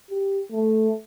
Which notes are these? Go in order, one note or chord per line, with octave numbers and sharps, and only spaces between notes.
G4
A3